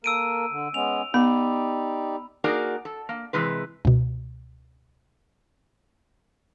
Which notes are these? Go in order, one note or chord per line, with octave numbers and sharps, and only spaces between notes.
A#3 A4 A#4 E6 D7 D#7
D3
G#3 B3 C#4 F7
B3 D#4 G4 D5 B5
A#3 D#4 F#4 G#4 A#4 D5
A4
A#3
C3 E3 G#3 B4
C#2 B2